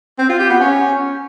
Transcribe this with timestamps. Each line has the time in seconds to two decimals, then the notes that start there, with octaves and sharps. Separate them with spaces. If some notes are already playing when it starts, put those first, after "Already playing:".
0.19 C4
0.29 F4
0.39 G4
0.50 B3
0.60 C#4